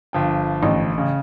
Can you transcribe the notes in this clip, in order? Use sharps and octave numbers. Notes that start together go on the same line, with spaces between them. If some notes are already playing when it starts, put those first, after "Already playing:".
G1 F3 G5
A1
C#3